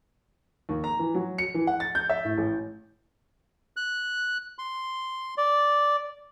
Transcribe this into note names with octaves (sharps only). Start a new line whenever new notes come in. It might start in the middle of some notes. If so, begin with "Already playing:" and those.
D#2
A#5
E3
F#3
C#7
E3
F#5
A6
G6
E5
A2
A1
F#6
C6
D5